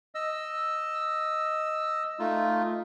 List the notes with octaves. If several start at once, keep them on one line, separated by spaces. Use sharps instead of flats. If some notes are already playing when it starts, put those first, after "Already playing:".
D#5 E6
A3 D#4 F4